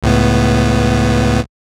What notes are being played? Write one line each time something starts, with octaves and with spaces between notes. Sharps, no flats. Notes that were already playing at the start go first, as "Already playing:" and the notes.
C#2 A2 B3